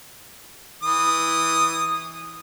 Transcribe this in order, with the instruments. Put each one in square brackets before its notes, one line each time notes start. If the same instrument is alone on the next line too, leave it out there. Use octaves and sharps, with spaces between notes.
[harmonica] E3 D#6